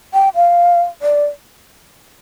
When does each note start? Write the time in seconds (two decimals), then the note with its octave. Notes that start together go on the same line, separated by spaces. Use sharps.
0.14 G5
0.35 F5
1.02 D5